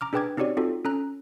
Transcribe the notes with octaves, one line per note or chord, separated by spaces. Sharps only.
A#5 D6 F6
D4 G#4 B4 G5 D6 G#6
C4 D#4 F#4 G4 C#5 D5
C4 D#4 F4 F#4 A4
C#4 A4 A#5 F#6